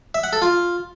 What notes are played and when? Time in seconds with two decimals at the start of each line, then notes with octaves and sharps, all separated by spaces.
0.15 E5
0.24 F#5
0.33 A4
0.42 F4